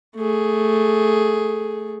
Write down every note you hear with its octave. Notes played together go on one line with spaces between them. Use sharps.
A3 G#4